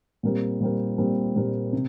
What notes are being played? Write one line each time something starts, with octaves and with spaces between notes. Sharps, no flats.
A#2 G3 C4 G4 A#4
A#2 G3 C4 G4 A#4
A#2 G3 C4 G4 A#4
A#2 G3 C4 G4 A#4
C3